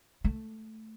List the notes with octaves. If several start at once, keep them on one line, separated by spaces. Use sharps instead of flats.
A3